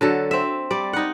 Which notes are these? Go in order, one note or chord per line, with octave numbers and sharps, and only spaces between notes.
D3 F#3 A4
C4 E5
G3 D5
D#4 F#5